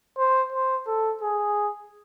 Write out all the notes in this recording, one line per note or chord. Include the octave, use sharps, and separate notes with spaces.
C5
C5
A4
G#4